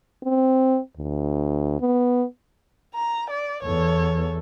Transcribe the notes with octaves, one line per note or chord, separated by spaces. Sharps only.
C4
D2
B3
A#5
D5
E2 A4 C#5